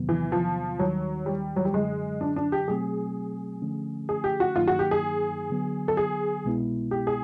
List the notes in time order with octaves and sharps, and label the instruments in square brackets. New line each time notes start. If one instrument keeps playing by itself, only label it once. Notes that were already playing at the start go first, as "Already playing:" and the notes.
Already playing: [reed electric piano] E2 C3 D#3 F#3 B3
[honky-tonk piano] E3
F3
[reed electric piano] D#2 D#3 G3 [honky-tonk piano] F#3
[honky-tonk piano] G3
F#3
G3
[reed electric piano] F#2 D3 F#3 [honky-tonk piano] G#3
[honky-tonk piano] D4
D4
G4
[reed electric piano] B2 F#3 A3 C4 [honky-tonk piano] G#4
[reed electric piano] D3 F3 A3 C#4
[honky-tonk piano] G#4
G4
F#4
[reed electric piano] G2 D#3 F#3 A#3 D#4 [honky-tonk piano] F4
[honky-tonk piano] F#4
G4
G#4
[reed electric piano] D3 F#3 B3
[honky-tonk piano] A4
G#4
[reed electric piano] C2 B2 G#3 B3 E4
[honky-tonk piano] G4
G#4